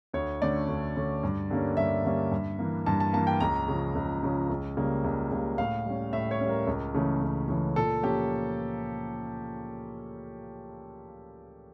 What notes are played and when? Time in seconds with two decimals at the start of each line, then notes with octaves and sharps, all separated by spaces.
0.13 D2 C#5
0.42 D3 A3 C#4 D5
0.68 D2
0.96 D3 A3 C#4
1.23 G2
1.50 D3 G3 A#3 C#4
1.77 G2 E5
2.04 D3 G3 A#3 C#4
2.31 G2
2.59 E3 A#3
2.86 G2 A5
3.00 A5
3.13 E3 A#3 A5
3.27 G5
3.40 C#2 A#5
3.68 C#3 F3
3.95 C#2
4.23 C#3 F3
4.50 C#2
4.77 C#3 G3 A#3
5.04 C#2
5.31 C#3 G3 A#3
5.58 A2 F5
5.86 G3 C#4
6.13 A2 E5
6.31 C#5
6.40 G3 C#4
6.49 A#4
6.67 C#2
6.94 C#3 E3 A3 C#4
7.22 C#2
7.48 C#3 E3 A3 C#4
7.76 A#2 A4
8.03 F3 A#3 C#4 G4